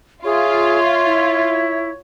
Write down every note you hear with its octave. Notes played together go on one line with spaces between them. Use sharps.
F4 G#4 C#5 E5
E4